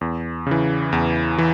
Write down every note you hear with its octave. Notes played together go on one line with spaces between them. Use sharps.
E2
C#3 E3
E2
E3